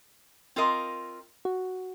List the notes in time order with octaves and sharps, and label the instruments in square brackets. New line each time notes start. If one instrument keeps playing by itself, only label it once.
[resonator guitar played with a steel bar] C4 F4 A#4 D#5
[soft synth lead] F#4